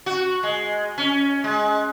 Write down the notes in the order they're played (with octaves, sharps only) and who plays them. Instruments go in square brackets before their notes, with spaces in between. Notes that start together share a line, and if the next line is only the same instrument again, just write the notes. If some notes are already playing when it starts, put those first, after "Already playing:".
[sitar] F#4
G#3
C#4
G#3